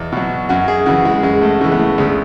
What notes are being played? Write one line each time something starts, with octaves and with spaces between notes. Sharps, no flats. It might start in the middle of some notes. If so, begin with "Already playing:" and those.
Already playing: E2 B2
B2 F#3
F#2 F#4
G#4
C#3 E3 F#4
G#3
F#2 G#3
A3
C#3 E3 G#3
B3
A3
D2 G#3